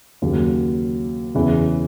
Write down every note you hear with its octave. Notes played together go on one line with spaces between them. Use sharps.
D#2 C#3 F#3
E2 C#3 E3